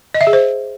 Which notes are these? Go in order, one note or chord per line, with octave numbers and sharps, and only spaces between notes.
D#5
E5
G#4
C5